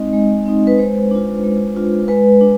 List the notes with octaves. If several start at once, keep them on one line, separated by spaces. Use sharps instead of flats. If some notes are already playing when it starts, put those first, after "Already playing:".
Already playing: G#3 C4 D#4 D#5
G#3
C4 D#4
B4
G#3 C5
D4 F4
G#3
D4 F4
G#3 B4
D4